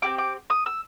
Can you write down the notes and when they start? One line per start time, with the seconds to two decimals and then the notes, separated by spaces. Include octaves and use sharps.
0.02 C4 E4 G4 D6
0.18 D6
0.50 D#6
0.66 E6